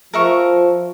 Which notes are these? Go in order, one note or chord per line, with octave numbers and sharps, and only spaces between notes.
F3 A#4 E5 C#6